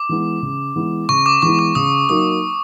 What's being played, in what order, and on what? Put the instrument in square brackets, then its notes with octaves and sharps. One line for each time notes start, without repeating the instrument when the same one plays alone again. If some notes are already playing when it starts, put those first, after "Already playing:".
Already playing: [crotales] D6
[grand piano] E3 G#3 B3 E4
C#3
E3 G#3 B3 E4
[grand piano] C#3 [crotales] C#6
[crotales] D6
[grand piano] E3 G#3 B3 E4 [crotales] C#6
[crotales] D6
[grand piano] C#3 [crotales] D#6
[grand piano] F#3 A#3 D#4 [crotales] D#6